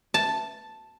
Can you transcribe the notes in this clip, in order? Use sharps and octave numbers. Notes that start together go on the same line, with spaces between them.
A5